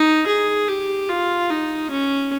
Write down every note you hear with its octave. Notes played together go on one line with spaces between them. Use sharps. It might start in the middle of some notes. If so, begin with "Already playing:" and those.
Already playing: D#4
G#4
G4
F4
D#4
C#4